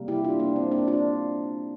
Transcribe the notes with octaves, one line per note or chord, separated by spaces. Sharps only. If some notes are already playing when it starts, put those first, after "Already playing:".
Already playing: C3 G3 A#3
E4 G4
D4 F4
A#3 D4
C4
A#3 D4
D4 F4